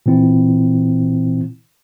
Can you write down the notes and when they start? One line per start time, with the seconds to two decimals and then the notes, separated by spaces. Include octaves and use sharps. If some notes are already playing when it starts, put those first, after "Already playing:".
0.06 A#2 E3 C4 E4